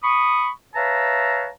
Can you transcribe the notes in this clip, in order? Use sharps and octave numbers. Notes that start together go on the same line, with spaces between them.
B5 C#6 D#6
B4 C#5 E5 F5 A5 A#5